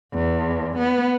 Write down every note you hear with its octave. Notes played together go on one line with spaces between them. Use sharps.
E2
B3